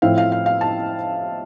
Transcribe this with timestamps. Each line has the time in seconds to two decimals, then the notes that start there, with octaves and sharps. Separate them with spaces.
0.02 A2 F3 C4 E4 F5
0.18 F5
0.32 F5
0.46 F5
0.61 A5